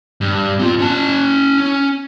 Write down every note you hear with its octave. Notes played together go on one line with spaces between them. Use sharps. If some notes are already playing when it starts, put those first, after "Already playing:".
G2
C4 F4
C#4 A5
C#4